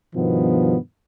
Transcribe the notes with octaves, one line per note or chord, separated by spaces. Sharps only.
G2 B2 D#3 F3 B3